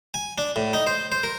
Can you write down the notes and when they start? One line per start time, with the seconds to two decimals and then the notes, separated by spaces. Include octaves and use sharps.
0.14 G#5
0.38 D4
0.56 A2
0.73 D#4
0.87 C5
1.12 C5
1.23 A#4